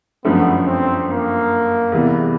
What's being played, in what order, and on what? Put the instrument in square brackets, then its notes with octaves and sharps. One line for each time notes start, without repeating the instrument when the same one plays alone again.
[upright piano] G1 F#2 D3 F3 A3 [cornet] B3
[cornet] C4
A#3
[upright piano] E2 C3 E3 G3 B3